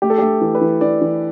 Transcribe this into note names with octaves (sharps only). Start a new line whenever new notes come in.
A3 G4
A4
G4
A3
E3
B4
E3
E3 D5
E3